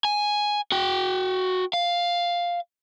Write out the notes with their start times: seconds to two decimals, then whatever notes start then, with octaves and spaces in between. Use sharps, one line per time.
0.05 G#5
0.72 F#4 G5
1.73 F5